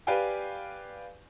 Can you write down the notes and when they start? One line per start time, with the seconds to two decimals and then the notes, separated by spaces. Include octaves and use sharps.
0.07 G4 B4 D5 F5 G5 G#5